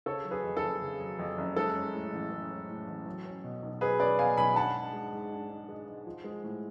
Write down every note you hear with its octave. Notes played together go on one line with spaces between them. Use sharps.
C#3 A4 C#5
F#3
G#4 B4
F2
A4
F#1
C#3
F#3
F2
F#1
G#3 A4
C#4
A2
A1
G#3
C#4
A2
A1
F#3
C#4
B2
B1
F#3 G#4 B4
C#4 B4 D5
B2 F5 G#5
B1 G#5 B5
D4 F#5 A5
G#2
G#3
G#2
D4
G#2
G#3
G#2
F3
G#3
A2